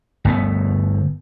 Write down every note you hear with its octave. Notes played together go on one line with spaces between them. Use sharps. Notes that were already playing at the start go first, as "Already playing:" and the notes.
G1 A3 B3